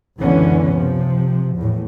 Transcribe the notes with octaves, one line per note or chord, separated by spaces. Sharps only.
C#2 F#2 D3 E3 B3 C#4
C3 F3
E2 A2